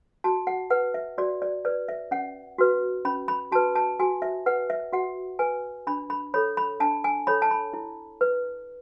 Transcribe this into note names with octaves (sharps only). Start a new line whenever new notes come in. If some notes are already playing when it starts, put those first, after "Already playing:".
F#4 A5
F#5
B4 F#5
E5
F#4 D5
D5
B4 D5
E5
C#4 F#5
F#4 B4
C#4 B5
B5
F#4 B4 A5
A5
F#4 G#5
E5
B4 F#5
E5
F#4 F#5
B4 G#5
D4 B5
B5
A4 C#5 B5
B5
D4 A5
G#5
A4 C#5 B5
A5
B5
E4
B4